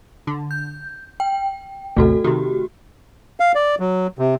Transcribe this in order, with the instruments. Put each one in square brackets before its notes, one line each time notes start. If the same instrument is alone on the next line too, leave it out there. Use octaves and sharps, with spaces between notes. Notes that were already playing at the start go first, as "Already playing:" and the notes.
[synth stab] D3
[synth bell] G6
G5
[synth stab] A1 D#2 C3 [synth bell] A3 F#4 A4
[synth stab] C3 D#3 [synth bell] F#4 G4
[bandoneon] F5
D5
F#3
C3